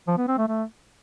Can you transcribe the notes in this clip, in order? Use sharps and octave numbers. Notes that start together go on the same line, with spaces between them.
F3
B3
C4
A3
A3